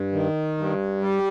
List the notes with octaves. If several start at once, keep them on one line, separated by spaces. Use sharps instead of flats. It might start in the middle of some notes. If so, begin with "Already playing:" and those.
Already playing: G2
D#3
G2
G3